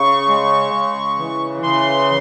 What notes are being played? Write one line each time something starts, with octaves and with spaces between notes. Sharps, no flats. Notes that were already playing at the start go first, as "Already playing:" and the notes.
Already playing: C#3 C#6
G#3
C#3
E3
C#3 C6